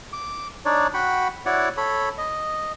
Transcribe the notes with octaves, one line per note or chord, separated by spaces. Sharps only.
D6
D4 D#4 C#5 D5
F#4 F#5 G5 B5
E4 F#4 C#5 D5 F#5
A4 C#5 B5
D#5